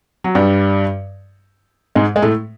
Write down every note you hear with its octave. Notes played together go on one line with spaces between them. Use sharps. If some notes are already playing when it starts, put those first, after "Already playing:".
F#3
G2 G3
G#2 G#3
G#3
A2 A3